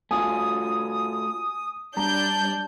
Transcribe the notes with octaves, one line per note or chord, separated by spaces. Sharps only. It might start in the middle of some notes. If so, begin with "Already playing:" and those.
A3 F4 F#4 G#5 D#6
G3 D4 A#5 G6